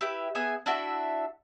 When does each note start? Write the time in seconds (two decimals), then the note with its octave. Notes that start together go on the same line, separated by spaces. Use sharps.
0.01 E4 G4 B4 E5
0.35 B3 G#4 E5 G#5
0.66 D4 E4 F#4 E5